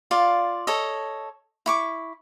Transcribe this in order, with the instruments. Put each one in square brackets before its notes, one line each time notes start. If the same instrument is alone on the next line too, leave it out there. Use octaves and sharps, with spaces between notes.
[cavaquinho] F4 D5 F5
A4 C#5 D#5
E4 C#6 D6